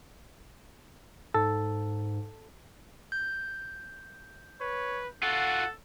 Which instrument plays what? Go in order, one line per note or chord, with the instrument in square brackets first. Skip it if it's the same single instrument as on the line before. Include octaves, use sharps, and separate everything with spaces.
[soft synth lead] G#2 [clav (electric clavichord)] A4
[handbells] G6
[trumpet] B4 [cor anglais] C#5
[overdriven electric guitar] F4 F#4 [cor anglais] A4 [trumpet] F#5